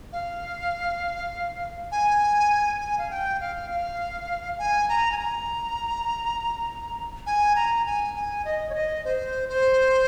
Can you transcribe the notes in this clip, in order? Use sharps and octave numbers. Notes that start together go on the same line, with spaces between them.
F5
G#5
G#5
F5
G5
F5
F5
G#5
A#5
G#5
A#5
G#5
A#5
G#5
G#5
D#5
C#5
D#5
C5
C5